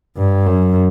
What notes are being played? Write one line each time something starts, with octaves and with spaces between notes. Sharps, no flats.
G2
F#2